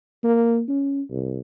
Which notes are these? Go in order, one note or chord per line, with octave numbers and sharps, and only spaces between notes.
A#3
C#4
C2